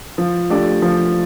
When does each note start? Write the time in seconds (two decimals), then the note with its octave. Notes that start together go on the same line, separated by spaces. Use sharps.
0.18 F3
0.50 A3 D4 G4 D5
0.82 F3